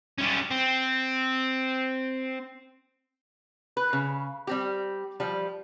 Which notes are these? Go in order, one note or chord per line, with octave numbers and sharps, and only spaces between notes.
G3 C#4
C4
B4
C#3
G3 C4 G4
F3 G3